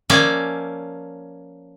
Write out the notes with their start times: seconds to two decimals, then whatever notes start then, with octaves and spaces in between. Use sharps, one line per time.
0.10 F3 A#3 C#4 D5 E5 G#5